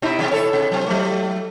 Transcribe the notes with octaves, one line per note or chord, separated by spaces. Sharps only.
B2 D#4 E4
C3 F#3 C4
E4 A4 C#5
C3
F#3 C4
F#3 A3